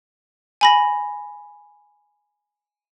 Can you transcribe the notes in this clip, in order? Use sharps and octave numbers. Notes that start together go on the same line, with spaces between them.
G#5 B5 A#6